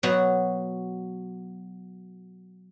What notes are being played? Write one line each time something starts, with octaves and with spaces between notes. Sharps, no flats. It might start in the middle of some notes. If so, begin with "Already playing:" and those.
B2 F#3 F#4